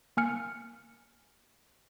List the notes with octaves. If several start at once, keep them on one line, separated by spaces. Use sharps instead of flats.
A#3 G#5 F6 C#7